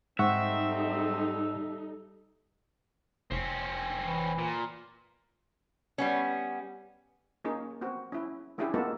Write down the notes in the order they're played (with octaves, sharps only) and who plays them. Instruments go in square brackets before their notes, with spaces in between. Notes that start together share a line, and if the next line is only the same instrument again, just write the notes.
[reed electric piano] G#2 F#5 C#6 [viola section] G3 D#4 A4 [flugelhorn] C4 [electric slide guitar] E5
[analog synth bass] F1 [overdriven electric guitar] C4 C#4
[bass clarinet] E3
[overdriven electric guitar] A#2
[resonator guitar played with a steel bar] G3 B3 C#4
[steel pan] A#3 C#4 D#4 G#4
B3 C4 F#4
C#4 E4
A3 C#4 D4 E4 G4 G#4
G#3 A#3 B3 D#4 F4 A4